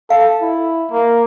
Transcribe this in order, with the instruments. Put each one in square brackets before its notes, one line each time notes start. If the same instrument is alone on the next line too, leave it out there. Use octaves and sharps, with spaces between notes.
[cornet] A4 [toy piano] F5
[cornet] E4
A#3